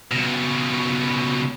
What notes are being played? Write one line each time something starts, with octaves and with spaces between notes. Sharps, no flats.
C#2 B2